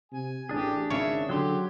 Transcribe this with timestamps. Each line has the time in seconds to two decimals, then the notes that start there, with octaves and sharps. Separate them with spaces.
0.12 C3 G#5
0.49 A1 D4 G4 G#4
0.90 G#1 C#3 C#5 E5
1.29 D3 F#3 G4 C6